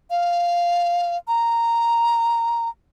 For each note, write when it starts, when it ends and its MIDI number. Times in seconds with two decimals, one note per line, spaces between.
0.11 1.17 77
1.28 2.69 82